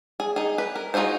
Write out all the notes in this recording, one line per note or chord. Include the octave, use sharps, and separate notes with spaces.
G#4
D#4 G#4
B4
A#4
D#4 F4 F#4 G#4 C5